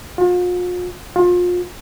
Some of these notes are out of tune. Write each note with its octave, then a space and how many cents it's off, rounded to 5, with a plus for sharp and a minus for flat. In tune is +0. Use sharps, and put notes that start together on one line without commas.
F4 +40
F4 +30